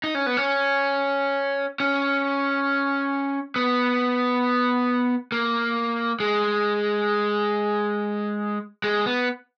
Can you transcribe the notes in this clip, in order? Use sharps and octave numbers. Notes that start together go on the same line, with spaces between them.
D#4
C#4
B3
C#4
C#4
B3
A#3
G#3
G#3
B3